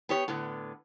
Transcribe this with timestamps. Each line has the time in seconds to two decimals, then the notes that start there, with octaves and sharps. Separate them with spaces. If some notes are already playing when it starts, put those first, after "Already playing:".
0.09 B3 G4 C#5
0.28 A2 D3 B3